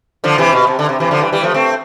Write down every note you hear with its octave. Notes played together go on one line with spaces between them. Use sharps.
D3 F3
C3 E3
B2
C3
D3
C3
C3 E3
D3 F3
E3 G3
E3 G3
F3 A3
A3 C4